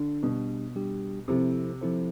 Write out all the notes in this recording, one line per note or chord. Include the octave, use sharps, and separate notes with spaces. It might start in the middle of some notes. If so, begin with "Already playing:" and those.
Already playing: D3
B2 G3 D4 G4
G3 D4 G4
C3 F3 C4 E4 A4 C5
F3 C4 E4 A4 C5